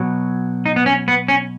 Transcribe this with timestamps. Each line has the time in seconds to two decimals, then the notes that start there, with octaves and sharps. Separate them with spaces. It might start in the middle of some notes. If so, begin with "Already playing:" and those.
Already playing: B2 F#3
0.66 D#4
0.76 B3
0.86 C#4
1.08 B3
1.28 C#4